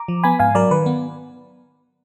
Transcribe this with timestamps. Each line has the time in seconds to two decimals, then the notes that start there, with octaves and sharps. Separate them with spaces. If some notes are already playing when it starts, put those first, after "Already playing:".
Already playing: A#5 D6
0.08 F3
0.24 B3 G#5 B5
0.39 G#2 F5 G#5
0.55 F#3 A#4 D5
0.71 D#3 B4
0.86 B3